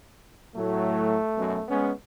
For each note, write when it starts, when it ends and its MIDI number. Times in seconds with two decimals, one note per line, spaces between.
0.56 1.17 45
0.56 1.17 54
0.56 1.67 57
1.37 1.58 42
1.37 1.58 47
1.68 1.91 56
1.68 1.91 59
1.68 1.91 61